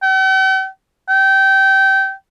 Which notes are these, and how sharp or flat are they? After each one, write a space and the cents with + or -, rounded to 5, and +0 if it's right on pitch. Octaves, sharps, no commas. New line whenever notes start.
G5 -45
G5 -20